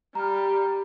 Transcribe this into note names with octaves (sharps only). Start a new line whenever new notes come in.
G3 A#5 F6